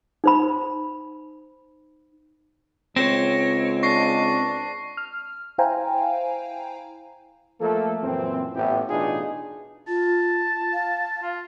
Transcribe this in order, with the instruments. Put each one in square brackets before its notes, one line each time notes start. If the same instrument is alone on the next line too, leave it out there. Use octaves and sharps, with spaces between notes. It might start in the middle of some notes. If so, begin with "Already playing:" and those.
[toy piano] D#4 C5 B5
[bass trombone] C#2 [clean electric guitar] C4 [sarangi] C#5 [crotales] A#6 E7
[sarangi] D4 [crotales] C#6 A#6 C7
[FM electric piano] F6
E4 C5 F5 G5 G#5 A#5
[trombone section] F3 A3 A#3 A4
F#2 A#2 E3 C4
A1 A2 E3 B3 G4
A1 B2 D4 D#4 F4 G#4
[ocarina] F4 [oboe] A5
[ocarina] F5
[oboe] F4